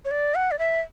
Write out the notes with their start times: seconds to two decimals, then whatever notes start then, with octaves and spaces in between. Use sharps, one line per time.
0.05 C#5
0.11 D5
0.35 F#5
0.51 D5
0.59 E5